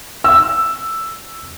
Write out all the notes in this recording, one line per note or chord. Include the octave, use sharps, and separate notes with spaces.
E6